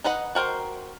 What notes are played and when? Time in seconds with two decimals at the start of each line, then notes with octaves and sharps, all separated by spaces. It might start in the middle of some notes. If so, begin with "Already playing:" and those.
0.04 D#4 B4 D#5 F#5
0.35 F#4 A#4 C5 G5